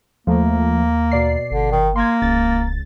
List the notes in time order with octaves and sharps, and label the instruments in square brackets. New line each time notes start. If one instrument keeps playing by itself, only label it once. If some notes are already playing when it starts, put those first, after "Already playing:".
[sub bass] D#2 [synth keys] F3 A3 [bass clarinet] A#3
[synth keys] B2 D5 C7
[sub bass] G1 [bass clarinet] D3
[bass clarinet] D#3
[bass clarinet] A#3 [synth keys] C6 G#6
[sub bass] D1 [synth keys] C#2 A6